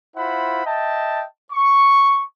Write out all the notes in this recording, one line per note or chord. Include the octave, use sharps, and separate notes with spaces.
E4 F4 C5 F#5 B5
D#5 E5 G5 A5
C#6